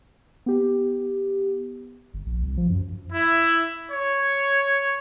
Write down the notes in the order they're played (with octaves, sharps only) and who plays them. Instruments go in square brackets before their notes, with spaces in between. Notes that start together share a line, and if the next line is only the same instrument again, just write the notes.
[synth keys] B3 G4
[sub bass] G1
A#1
C2
F3
F#2
[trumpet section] E4
C#5